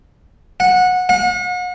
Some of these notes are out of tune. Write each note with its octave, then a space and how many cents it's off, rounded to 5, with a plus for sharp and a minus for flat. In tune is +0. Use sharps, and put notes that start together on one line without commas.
F#5 -20
F#5 -40